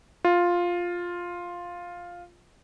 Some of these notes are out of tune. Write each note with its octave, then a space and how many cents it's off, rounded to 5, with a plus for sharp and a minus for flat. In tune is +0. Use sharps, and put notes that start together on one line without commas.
F4 +5